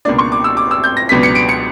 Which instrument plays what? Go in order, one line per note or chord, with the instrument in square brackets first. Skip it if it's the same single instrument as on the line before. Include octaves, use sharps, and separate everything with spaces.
[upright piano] C#2 B2 A#3 D4 D5
C#6
D6
E6
D6
E6
G6
A#6
C#2 B2 F#3 B3 D4 B6
C#7
D7
C#7